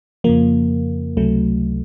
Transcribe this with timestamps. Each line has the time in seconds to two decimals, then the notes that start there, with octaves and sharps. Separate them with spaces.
0.24 F2 C#3 F3 A#3
1.17 C#2 C3 F#3 A3